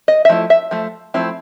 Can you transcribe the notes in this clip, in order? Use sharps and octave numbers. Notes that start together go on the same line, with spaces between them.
D#5
E5
F3 A3 E4
E5
F3 A3
F3 A3 C4 E4